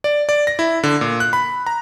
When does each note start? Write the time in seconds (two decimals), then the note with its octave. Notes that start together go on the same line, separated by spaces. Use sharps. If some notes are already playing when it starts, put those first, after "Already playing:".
0.04 D5
0.29 D5
0.47 A#6
0.59 E4
0.83 D3
1.01 A#2
1.20 F#6
1.33 B5
1.67 A#5